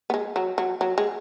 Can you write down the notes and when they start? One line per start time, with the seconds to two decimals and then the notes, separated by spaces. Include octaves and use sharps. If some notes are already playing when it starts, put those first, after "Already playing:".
0.10 B3
0.14 G#3
0.36 F#3
0.58 F#3
0.81 F#3
0.98 G#3